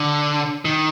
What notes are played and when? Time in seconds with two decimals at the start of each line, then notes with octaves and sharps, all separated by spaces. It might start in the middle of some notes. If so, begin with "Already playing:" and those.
Already playing: D3
0.65 D#3